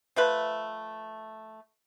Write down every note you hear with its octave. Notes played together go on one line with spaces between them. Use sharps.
F3 A3 B4